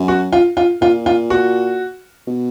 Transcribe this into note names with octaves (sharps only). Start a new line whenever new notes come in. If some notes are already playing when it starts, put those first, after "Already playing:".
Already playing: F#2
F#4
F4
F4
A#2 F4
F4
F#4
B2